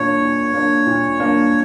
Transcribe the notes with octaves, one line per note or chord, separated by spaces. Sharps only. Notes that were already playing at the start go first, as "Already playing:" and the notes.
Already playing: A#2 A#3 D4 C#5
A#2
A#3 D4
A#2
A#3 D4